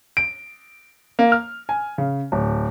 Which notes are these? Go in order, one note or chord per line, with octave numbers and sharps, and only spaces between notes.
D7
A#3
F6
G#5
C#3
D1